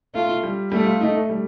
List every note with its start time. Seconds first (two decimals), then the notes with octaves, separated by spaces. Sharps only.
0.15 A3 F4
0.43 G3
0.72 G3 A3
0.86 F4
1.01 D#4
1.15 A3
1.30 G3